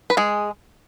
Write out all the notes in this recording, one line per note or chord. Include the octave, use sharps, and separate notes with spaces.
B4
G#3 G#4